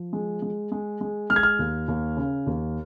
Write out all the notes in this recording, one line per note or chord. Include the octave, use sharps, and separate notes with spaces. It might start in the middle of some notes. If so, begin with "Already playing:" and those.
Already playing: F3
G#3
G#3
G#3
G#3
G#3 F6
G#6
F6
D#2
D#2
C#3
D#2